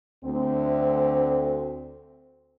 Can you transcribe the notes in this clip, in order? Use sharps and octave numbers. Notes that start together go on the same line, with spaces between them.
D2 C4